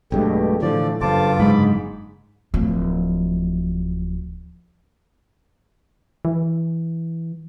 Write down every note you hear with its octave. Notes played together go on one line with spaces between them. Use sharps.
B1 G2 B2 G#3 A3 G4
A2 D3 E3 F3 A3 D5
F#1 G2 F4 A4 C5 A5 D6
G#2 D3 B5
D1 F3
E3